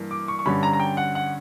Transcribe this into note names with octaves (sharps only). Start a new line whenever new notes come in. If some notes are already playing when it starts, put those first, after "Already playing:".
Already playing: G2 E3 A#3
D6
C#6
C#6
G2 D3 G3 C#4 B5
A#5
A#5
G5
F#5
F#5